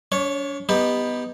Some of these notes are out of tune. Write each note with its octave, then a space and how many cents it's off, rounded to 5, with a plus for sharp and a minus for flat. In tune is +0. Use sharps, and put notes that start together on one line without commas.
D4 -45 C#5 -10
B3 +0 D#4 +0 G4 +15